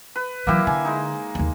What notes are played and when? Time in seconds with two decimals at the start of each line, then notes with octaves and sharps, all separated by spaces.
0.16 B4
0.47 E3 F#3 A#3 E4 G4
0.67 D3 G#5
0.85 G#3 D#4
1.35 D1 D#2